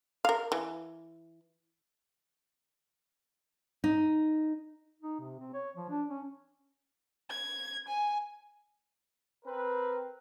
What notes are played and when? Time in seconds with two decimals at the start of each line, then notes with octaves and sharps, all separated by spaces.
0.25 A#4 F5
0.52 E3
3.84 D#4
5.02 D#4
5.19 C3
5.40 C4
5.54 C#5
5.76 F3
5.90 D4
6.10 C#4
7.30 G#6
7.88 G#5
9.45 C4 A#4 B4